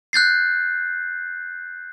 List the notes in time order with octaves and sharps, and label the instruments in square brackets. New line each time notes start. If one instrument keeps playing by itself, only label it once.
[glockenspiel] F#6 G6 A6 C7